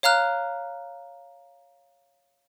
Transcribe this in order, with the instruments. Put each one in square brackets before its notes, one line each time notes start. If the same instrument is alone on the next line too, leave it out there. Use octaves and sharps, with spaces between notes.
[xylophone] C#5 F5 A#5 F6 F#6